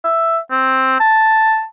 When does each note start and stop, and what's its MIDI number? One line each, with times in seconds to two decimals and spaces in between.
0.04 0.38 76
0.51 0.96 60
1.00 1.65 81